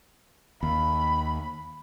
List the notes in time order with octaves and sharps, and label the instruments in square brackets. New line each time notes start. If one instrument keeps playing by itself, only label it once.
[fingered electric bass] D#2 [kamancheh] B5